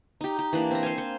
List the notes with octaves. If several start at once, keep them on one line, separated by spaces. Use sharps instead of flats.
D#4 G4
G4
E3 A#3 D4
C4 A#5
C5 F5 G#5
C5